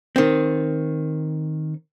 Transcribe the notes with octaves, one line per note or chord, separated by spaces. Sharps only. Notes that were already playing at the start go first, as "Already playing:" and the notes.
D#3 C4